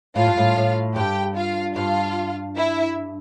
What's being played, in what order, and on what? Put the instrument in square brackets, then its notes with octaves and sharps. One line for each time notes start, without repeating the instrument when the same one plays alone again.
[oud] A2 [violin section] F4 F5
[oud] G2
A2
A2
[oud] G2 [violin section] G4 G5
[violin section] F4 F5
[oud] G2 [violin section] F4 F5
[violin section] E4 E5